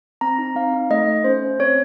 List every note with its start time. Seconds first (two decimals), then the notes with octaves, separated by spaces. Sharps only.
0.21 C4 A#5
0.39 D#4
0.56 C4 F5
0.73 D#4
0.90 A3 D#5
1.07 A3
1.24 C#4 C5
1.42 C#4
1.59 C4 C#5